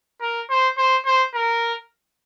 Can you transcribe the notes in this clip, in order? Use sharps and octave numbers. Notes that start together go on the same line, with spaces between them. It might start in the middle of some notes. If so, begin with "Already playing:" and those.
A#4
C5
C5
C5
A#4